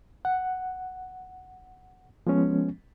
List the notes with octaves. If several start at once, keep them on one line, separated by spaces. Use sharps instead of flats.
F#5
F3 G#3 B3 C#4